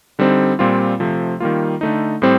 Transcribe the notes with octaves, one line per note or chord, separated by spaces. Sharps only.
D3 G3 C4 D#4
A#2 G3 C4 F4
C3 F3 A3
D#3 G3 A#3 F4
D3 A3 D#4
A2 G3 C4